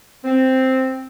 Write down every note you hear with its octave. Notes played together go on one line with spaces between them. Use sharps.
C4